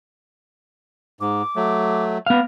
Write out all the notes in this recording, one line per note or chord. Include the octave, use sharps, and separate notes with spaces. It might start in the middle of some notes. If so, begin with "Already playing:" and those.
G#2 D6
F#3 A3
B3 F5